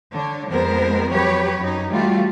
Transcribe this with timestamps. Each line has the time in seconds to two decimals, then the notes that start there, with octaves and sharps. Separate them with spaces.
0.13 D3 D4 C#5
0.50 F2 G#3 B3 A#4 C5
1.13 F2 F#3 G4 B4 C#5
1.59 F#2 D#4
1.91 E3 G3 A3 F4 F#4